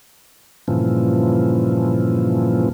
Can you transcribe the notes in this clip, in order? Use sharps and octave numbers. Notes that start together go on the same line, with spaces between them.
G2 A#2 C#3 E3 F3